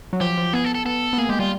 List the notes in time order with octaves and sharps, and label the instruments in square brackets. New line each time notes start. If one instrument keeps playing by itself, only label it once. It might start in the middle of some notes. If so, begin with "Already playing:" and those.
[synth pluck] F#3
[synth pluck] F3 [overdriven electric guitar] G4
[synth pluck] F3
[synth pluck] B3 [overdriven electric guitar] G#4
[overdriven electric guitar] A4
A4
[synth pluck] B3 [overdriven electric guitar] A4
[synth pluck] B3
[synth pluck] A#3 [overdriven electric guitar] G#4
[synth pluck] G#3 [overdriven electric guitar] G4
[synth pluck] G3 [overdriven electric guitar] F4